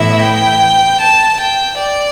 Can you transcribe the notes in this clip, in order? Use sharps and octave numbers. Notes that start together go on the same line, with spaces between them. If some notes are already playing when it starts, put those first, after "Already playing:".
Already playing: A2 E3 B3 E4 E5
G5
A5
G5
D5